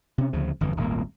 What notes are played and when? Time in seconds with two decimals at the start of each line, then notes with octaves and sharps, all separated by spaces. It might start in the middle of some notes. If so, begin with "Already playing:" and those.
0.18 C3 C#4
0.33 D2 C#3 F3
0.61 G1 F2 D3 E3
0.76 D#1 G#1 A#2 A#3